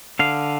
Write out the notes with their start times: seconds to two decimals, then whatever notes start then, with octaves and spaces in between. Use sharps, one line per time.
0.19 D3 F5